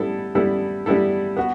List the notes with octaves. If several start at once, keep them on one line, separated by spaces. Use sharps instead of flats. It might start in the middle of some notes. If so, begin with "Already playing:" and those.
Already playing: G3 B3 E4 A4
G3 B3 E4 A4
G3 B3 E4 A4
B3 F#4